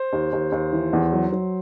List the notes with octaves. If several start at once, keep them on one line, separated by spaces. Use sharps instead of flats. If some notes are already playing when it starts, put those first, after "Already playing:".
Already playing: C5
D#2
D#2
D#2
E3
E2
F#3
F#3